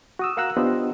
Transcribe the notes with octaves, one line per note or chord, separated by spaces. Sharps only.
F#4 D#6 E6
A#4 F5 F#5 A#5 E6 F#6
B3 D4 F4 G4 C5 D#5